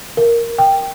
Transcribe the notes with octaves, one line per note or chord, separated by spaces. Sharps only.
A#4
G5